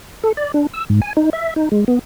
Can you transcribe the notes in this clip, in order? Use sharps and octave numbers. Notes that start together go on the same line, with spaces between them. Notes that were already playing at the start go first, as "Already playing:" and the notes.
A4
D5
D4
E6
G#2
G#5
D#4
E5
D#4
G#3
B3